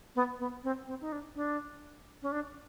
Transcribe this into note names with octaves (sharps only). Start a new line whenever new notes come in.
B3
B3
C4
C4
D#4
D4
D4
C#4
D4